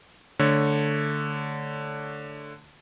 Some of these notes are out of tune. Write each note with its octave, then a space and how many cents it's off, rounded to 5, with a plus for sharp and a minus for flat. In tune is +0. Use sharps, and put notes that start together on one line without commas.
D3 +0 A3 +0 C#5 -5